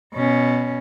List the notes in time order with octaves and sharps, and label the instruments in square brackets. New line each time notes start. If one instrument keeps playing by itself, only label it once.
[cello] B2 C#4